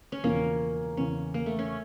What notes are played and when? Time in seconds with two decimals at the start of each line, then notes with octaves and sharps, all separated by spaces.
0.12 C#4
0.23 E1 E2 C#3 F3 A#3
0.97 E2 C#3 E3 C#4
1.34 A#3
1.46 A3
1.59 C#4